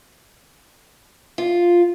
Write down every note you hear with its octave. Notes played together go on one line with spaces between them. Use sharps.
F4